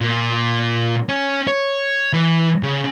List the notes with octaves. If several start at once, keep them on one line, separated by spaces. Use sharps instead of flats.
A#2
C#4
C#5
E3
C#3